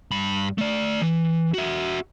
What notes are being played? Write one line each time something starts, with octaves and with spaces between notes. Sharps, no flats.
G2 B5
A3 D5
E3
F#4 E5